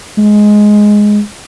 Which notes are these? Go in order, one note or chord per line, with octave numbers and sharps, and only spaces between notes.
G#3